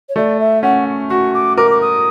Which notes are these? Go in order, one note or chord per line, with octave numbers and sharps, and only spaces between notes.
C#5
A3 D5
E5
C#4 F#5
F#4 C#6
D6
A#4 D6
D6
D#6